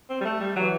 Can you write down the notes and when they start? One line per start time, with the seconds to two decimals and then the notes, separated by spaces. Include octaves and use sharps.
0.10 C4
0.21 G3
0.25 A3
0.40 G3
0.56 E3 F#3